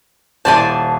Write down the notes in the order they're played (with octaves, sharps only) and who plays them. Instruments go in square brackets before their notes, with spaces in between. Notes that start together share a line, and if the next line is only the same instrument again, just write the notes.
[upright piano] D#1 E4 [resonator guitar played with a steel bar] C5 D5 G#5 [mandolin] A5